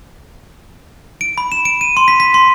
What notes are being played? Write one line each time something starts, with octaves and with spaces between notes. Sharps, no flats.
D7
B5
E7
D7
D#7
C6
B6
B6
C6